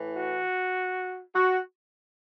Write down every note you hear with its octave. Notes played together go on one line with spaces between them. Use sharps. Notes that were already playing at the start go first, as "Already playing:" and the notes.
Already playing: A2 E3
F#4
F#4